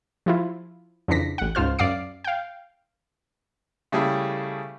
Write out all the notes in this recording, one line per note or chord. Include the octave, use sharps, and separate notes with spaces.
F3 E4 F4
F2 C#3 E3 D4 A#6 B6
A1 F#5
C#2 G#2 F4 C5 F6
F#2 D5 F5 D6 C7
F5 G5
C#3 G3 A3 E4 G#4